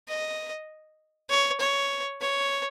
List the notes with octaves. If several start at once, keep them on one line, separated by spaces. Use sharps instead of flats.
D#5
C#5
C#5
C#5